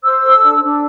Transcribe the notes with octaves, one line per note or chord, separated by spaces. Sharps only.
C5 E6
A4
D4
D4